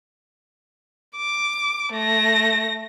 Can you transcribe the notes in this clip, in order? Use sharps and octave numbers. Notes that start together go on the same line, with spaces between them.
D6
A3 A#6